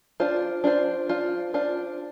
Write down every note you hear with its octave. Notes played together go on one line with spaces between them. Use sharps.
D4 F4 C5
D4 F4 C5
D4 F4 C5
D4 F4 C5